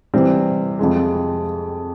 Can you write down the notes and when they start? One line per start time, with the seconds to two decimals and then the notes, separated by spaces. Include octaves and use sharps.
0.14 C3 E3 G3 C4
0.79 F2 C3 F3 G#3